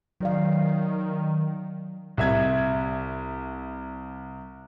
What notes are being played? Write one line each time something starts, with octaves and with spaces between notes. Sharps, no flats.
D#3 F#3 D5 F5
C2 E5 G#6